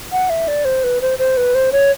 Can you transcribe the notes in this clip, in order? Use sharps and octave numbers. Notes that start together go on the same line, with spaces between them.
F#5
E5
D5
C5
B4
C5
C5
B4
C5
C#5